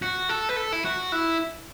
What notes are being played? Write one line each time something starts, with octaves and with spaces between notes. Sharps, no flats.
F#4
A4
B4
A4
E4
F#4
E4